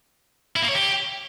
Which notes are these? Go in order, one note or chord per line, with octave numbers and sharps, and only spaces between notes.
E4
A#3
C#5
G4